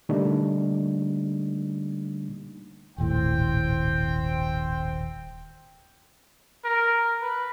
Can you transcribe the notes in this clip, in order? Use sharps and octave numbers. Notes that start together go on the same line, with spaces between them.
D3 G3 A3 A#3 D4 D#4
D#1 G#1 A2 C4 C5 G5
A#4
B4